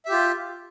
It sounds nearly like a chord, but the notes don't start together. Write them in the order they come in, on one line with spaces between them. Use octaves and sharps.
E5 G4 F4